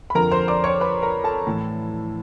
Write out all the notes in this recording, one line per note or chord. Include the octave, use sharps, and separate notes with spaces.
B5
F2 D3 A#4 A#5
C5 C6
D5 D6
C#5 C#6
B4 B5
A#4 A#5
A4 A5
A2 E3